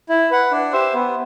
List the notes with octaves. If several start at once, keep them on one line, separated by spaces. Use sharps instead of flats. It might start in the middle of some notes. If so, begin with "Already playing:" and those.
E4
B4 F#5
D4
G4 C5 E5
B3